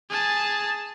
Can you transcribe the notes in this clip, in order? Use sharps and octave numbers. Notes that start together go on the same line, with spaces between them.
G#4 A5